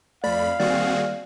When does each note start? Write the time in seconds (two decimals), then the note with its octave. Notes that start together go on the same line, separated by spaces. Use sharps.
0.24 F2 A3 D5 F5 B5
0.60 D#3 G3 A#3 C4 F#4 G#4 D5